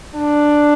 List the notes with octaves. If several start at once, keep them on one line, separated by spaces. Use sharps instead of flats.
D4